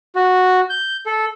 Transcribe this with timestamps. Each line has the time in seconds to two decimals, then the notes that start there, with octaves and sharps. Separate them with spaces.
0.16 F#4
0.70 G6
1.06 A4